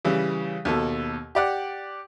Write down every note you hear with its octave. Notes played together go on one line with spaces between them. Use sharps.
C#3 E3 G3
D#2 B2 A4
G4 D5 F#5